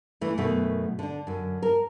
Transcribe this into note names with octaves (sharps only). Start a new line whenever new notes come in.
E3 A3
F#2 B2 D#3 A3
D3 D4
F#2 D3
A#4